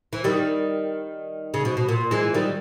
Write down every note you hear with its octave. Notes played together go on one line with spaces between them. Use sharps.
E3
D#3 G3
C#3
B2
B2
A#2
E3 G#3
D#3 G3